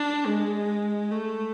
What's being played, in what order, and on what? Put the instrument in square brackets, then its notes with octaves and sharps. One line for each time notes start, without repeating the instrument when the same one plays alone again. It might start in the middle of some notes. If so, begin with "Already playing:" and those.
Already playing: [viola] D4
G#3
A3